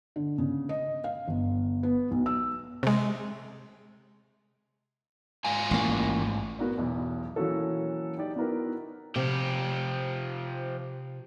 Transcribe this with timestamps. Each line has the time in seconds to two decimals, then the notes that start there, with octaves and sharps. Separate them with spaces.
0.16 D3
0.38 C#3
0.69 D#5
1.04 F5
1.28 G1
1.83 B3
2.11 B1
2.26 E6
2.83 C3 G#3
5.45 G#2 F4 G#5
5.71 A1 A#3
6.59 B3 F#4 A#4 D5
6.78 B1 E2
7.36 E3 F#3 A#3 C#4 F#4 A4
8.17 D#4 G4 D5
8.36 B3 D#4 E4 F#4 A#4 B4
9.16 C3 F3 G4